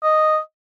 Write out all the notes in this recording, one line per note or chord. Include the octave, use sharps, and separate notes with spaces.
D#5